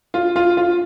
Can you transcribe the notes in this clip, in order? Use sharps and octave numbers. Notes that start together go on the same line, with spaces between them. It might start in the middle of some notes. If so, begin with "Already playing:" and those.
F4
F4
F4